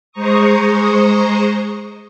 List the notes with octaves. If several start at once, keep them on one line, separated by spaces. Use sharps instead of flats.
G#3 C5 A#5 C#6 D#6